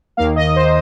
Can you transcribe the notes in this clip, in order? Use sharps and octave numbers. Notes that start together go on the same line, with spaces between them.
D#2 D#3 A#3 F5
D#5
C5